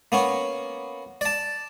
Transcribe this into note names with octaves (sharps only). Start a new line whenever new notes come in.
A#3 B3 C#4
D5 A5